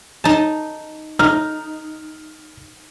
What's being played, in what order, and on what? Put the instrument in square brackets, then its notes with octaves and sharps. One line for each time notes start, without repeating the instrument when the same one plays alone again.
[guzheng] D#4 A5
[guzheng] D#4 [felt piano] F6